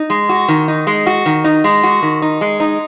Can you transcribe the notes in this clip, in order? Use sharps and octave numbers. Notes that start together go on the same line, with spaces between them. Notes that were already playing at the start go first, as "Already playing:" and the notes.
Already playing: D#4
G#3
F#4
D#3
D#4
G#3
F#4
D#3
D#4
G#3
F#4
D#3
D#4
G#3
D#4